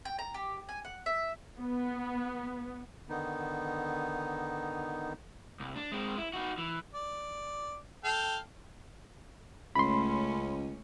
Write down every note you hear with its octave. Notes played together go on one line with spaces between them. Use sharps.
G5
A#5
G4
G#5
F#5
E5
B3
D3 D#3 B3 D#4
C2
D4
G#3 C4
E4
D#4 F#4
E3
D5
A4 F5 G5
C#2 A3 C#4 B5 C6